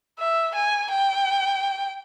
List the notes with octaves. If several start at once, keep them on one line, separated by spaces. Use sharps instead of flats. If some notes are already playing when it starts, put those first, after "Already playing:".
E5
G#5
G5